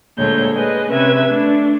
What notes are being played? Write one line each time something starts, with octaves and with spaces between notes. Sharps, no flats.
D2 A#2 G#3 A3 C#5 G6
G#3 G#4 B4 D#5
C3 C#4 B4 E5 G#6
A3 D4